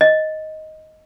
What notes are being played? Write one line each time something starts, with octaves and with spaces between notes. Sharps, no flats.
D#5